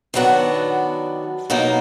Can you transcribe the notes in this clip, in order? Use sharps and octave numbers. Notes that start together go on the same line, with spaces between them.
D#3 F#3 B3 D4 F#4
B2 F#3 A#3 D#4